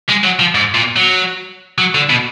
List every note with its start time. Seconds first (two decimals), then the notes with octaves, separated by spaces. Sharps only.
0.09 G#3
0.24 F#3
0.39 F3
0.55 G#2
0.75 A#2
0.97 F#3
1.78 F#3
1.95 D3
2.10 B2